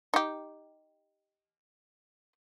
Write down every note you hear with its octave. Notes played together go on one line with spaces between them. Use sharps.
D#4 G4